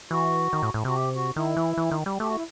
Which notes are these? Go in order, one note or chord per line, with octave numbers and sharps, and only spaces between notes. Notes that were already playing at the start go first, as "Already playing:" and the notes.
E3 F#4
D#3
A2
A2
C3 F#4
G4
F#4
D#3 E4
E3
E3
D#3
G3
A3 G4
F#4
E4